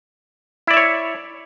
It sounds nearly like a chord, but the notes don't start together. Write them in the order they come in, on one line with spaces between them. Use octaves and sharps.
E4 D5 E5 C#5